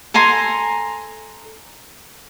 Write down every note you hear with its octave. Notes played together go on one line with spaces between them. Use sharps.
A4 G#5 A#5 C6